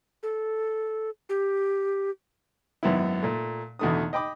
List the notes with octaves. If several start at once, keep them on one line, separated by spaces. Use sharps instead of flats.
A4
G4
G#1 F#2 B3 E4
A#2 A3
E2 B2 D3 A3 D#4 D#6
D#5 G5 B5 D6